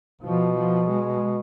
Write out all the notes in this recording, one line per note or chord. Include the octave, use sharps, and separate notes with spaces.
B2 F3
F3
G#3